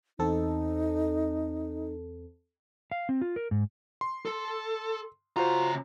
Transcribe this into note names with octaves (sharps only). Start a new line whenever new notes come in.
E2 C4 D#4 A4
F5
C4
F4
A#4
G#2
C6
A4
C#3 F4 F#4 C5 A#5